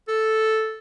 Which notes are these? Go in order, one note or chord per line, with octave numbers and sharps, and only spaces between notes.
A4